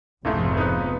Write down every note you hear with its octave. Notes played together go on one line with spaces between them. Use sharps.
F1 C#2 G#2 F3 A3
B3 D#4 B4